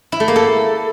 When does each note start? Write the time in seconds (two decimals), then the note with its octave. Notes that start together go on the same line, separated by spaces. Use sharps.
0.12 E4
0.20 A3
0.28 A#3
0.36 A4